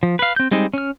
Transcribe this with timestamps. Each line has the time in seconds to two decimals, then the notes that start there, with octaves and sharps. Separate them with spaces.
0.03 F3
0.19 B4 F5
0.36 C4 G6
0.51 G3 G#3 C4 D#4
0.74 C#4 F6